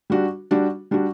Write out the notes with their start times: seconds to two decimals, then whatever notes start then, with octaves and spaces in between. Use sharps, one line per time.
0.10 G3 D4 F#4
0.51 G3 D4 F#4
0.91 G3 D4 F#4